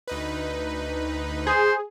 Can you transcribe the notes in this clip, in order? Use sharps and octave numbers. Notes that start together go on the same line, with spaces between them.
D2 D#4 B4
G#4 C5